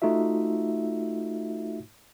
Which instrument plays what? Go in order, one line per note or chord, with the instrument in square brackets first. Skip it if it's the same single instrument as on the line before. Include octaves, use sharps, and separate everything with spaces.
[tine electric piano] A3 D#4 F4 F#4 E5